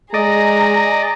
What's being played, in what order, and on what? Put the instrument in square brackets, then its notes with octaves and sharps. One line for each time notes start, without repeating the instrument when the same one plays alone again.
[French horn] G#3 [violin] G#4 A#5 [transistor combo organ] D5 D#5